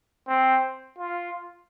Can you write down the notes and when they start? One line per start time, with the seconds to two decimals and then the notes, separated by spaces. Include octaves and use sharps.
0.28 C4
0.98 F4